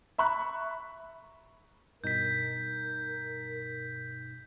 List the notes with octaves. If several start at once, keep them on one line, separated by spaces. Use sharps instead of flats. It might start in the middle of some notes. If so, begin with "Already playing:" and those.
E5 A#5 B5 C#6 F#6
G2 B2 D#4 A#4 G6 B6